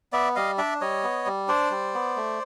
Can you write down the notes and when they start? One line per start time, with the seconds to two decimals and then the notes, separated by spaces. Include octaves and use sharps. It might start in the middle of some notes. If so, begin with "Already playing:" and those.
0.13 B3 D5 E5
0.36 G3 D#5 F5
0.58 D4 D5 E5
0.81 G3 C#5 D#5
1.04 B3
1.26 G3
1.48 D4 C5 D5
1.71 G3
1.94 B3
2.16 A3